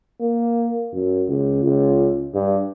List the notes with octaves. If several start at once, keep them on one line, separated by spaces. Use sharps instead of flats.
A#3
F#2
C#2
C#2
G2